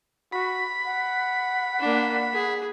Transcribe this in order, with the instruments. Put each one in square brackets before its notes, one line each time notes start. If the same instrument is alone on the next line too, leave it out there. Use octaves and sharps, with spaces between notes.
[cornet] F#4 [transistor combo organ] B5
[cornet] F#5
[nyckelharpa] A#3 D4
G#4